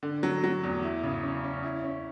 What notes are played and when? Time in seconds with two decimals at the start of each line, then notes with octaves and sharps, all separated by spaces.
0.03 D3
0.23 F#3
0.44 F#3
0.64 E2
0.83 E4
1.04 C#3
1.23 C#4
1.44 C#4
1.63 E4
1.84 C#4